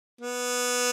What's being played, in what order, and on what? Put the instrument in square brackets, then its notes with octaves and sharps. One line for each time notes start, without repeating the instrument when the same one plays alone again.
[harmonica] B3